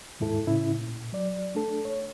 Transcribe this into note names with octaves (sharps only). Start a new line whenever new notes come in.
D#2 G#2 E4 A4
A2 C#3 C#4 E4
A#2
F#3 D5
A3 D4 A4
C#5